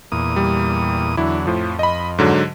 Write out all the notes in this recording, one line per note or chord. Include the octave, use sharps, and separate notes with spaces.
E2 A#2 D#6
G3
E2 D3 F#3 E4
F2 A2 F3
D#5 B5
G#2 D3 F#3